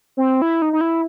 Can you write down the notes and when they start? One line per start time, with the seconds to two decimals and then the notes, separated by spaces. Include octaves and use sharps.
0.17 C4
0.42 E4
0.62 D#4
0.73 D#4
0.81 E4